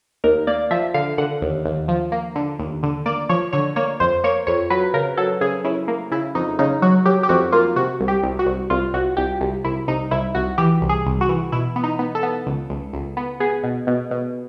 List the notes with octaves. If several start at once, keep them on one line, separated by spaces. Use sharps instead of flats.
D#2 A#4
A#3 D5
F3 E5
D3 F5
D3 F#5
D#2
D#2
F3
A#3
D3
D#2
D3
A#3 D5
F3 C#5
D3 C#5
A#3 C#5
F2 C5
A#3 C#5
F2 C#5
F#3 B4
C#3 A#4
F#3 A4
C#3 G#4
C#3 E4
A#3
C#3 E4
F2 D#4
C#3 D#4
F#3 F#4
F#3 G4
G4
F2 F#4
A#3 F4
C3 F#4
C2
G4
C2
F#4
C2
C2 F4
C2 F#4
C2 G4
C2
C2 E4
C2 D#4
C2 E4
C2 F#4
E3 G4
C2
G#4
C2
F#4
E3
B2 E4
B3
D#4
B3
A4
B3
C#2
C#2
C#2
B3
B3 G#4
B2
B2
B2